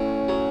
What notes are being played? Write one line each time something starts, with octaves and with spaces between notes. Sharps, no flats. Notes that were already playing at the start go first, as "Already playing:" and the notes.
Already playing: A2 C#4
F#3